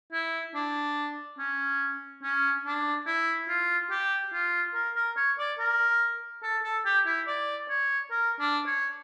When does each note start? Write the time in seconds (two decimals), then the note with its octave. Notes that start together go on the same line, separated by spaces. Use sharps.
0.12 E4
0.54 D4
1.38 C#4
2.23 C#4
2.65 D4
3.06 E4
3.48 F4
3.91 G4
4.33 F4
4.75 A#4
4.96 A#4
5.17 C#5
5.38 D5
5.59 A#4
6.43 A4
6.64 A4
6.85 G4
7.06 E4
7.27 D5
7.69 C#5
8.11 A#4
8.40 D4
8.67 C#5